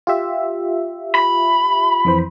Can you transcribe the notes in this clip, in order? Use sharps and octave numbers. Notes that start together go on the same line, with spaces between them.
F4 G4 E5
B5
F2 E3 C5